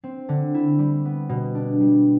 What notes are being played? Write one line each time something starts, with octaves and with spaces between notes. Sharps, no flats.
C4
D3
E4
G3
B3
B2
D4
G3